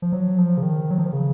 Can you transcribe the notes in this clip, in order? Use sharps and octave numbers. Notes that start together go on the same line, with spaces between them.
F3
F#3
F3
C#3
D#3
F#3
F3
D#3
C#3